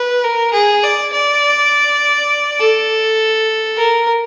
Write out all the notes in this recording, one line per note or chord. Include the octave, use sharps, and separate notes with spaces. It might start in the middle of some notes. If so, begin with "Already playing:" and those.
Already playing: B4
A#4
G#4
D5
D5
A4
A#4